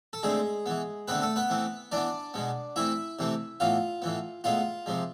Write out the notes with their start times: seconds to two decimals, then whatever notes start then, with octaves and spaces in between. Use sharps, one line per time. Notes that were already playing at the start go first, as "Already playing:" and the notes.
0.13 A4
0.23 D3 G#3 A3 C4 G#4
0.66 E3 B3
1.08 D3 A3 B3 C4 B4
1.22 A3 A4
1.36 B3 B4
1.50 E3 A3 C4
1.92 E3 B3 D4 D5
2.34 B2 G#3 B3
2.76 E3 A3 C4 E4 E5
3.19 C3 E3 A3 C4
3.60 A2 E3 B3 F4 F5
4.02 A2 E3 B3
4.44 A2 G#3 B3 F4 F5
4.86 C3 F3 G#3